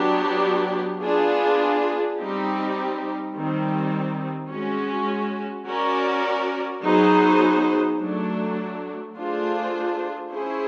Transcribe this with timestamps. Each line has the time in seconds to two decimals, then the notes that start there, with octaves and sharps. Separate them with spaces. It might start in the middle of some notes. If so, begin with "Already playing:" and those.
Already playing: F#3 B3 D4 G4
1.02 B3 D4 F4 G#4
2.18 G3 C4 D#4 G4
3.34 D#3 G3 C4
4.50 G#3 C#4 F#4
5.67 C#4 F#4 A#4 D5
6.83 F#3 B3 D#4 G#4 C5
7.99 F#3 A3 D4
9.14 A3 D4 F4 G#4 C5
10.31 C#4 E4 G#4 C5